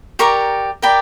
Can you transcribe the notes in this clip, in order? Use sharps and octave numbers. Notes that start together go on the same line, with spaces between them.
G4 A#4 D5 A#5 C#6
G4 A#4 D5 G5 B5